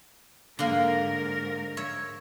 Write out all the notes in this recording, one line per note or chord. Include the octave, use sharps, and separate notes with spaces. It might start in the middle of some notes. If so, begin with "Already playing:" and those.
G#2 D3 A#3 A#4
C#5 E5